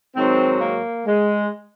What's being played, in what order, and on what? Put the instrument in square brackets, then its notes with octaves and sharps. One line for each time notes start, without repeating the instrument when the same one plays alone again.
[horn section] G#2 D#3 F#3 C4
A#3
G#3